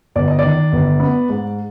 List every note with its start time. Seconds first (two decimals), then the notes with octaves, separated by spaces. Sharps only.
0.15 G1 D5
0.28 D#5
0.39 D#3 D5
0.72 G1
1.00 B3
1.29 G#2